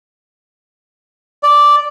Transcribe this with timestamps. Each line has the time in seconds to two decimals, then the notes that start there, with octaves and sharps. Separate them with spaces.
1.43 D5